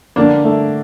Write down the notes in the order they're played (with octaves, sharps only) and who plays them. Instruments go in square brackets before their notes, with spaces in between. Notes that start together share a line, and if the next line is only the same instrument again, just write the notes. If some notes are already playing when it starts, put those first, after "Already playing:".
[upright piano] D3 [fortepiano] A#3 D4
[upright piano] A3